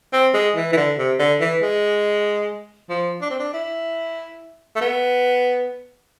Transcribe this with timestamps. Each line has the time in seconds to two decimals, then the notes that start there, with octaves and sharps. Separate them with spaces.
0.13 C4
0.34 G#3
0.56 E3
0.72 E3
0.76 D3
0.98 C3
1.19 D3
1.41 E3
1.62 G#3
2.89 F3
3.21 D4
3.30 C4
3.39 D4
3.53 E4
4.75 A3
4.81 B3